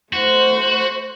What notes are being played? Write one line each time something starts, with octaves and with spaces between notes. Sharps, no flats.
A3 F#4 C5